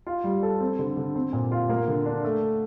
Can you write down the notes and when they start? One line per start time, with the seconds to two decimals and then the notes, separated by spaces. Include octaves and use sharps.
0.07 F4
0.24 G3
0.43 A4
0.61 C4
0.79 D3
0.97 D3
1.15 C4
1.33 A#2
1.52 F4
1.69 A#3
1.88 D3
2.06 D4
2.24 A3